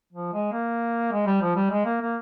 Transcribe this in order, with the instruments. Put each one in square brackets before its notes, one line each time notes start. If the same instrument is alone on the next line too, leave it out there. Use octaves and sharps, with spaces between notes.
[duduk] F3
G#3
A#3
G#3
G3
F3
G3
G#3
A#3
A#3